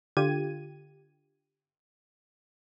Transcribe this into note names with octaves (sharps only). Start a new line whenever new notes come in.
D3 F4 G4 G#6 D#7